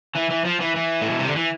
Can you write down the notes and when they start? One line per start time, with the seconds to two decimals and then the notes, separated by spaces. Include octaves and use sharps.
0.16 E3
0.31 E3
0.45 F3
0.61 E3
0.76 E3
1.01 A2
1.10 B2
1.19 C3
1.27 D3
1.36 E3